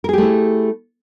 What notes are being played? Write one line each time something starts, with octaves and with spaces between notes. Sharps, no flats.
A3 E4 G4 G#4 A#4